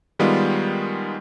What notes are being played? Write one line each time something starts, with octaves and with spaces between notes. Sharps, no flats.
D#3 G3 G#3 B3 F4